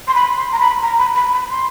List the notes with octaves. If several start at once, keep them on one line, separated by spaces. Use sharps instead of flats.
C6
B5
C6
A#5
B5
A#5
B5
B5
B5
C6